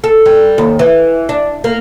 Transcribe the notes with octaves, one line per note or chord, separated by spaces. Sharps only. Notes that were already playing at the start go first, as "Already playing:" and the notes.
A4
G3
D#2
E3
D4
A#3